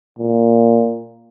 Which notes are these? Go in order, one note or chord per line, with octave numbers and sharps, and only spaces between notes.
A#2